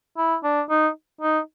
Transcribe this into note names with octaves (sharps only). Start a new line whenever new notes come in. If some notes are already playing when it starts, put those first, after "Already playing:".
E4
D4
D#4
D#4